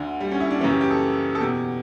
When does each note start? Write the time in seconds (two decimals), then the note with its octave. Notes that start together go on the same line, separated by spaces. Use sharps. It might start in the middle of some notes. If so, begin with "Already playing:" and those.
Already playing: D2 D3
0.21 G3
0.32 C#4
0.40 E4
0.50 D4
0.60 F#2 C#3 E3 C#4
0.70 G4
0.81 G4
0.91 A4
1.35 A4
1.40 E2 B2 G4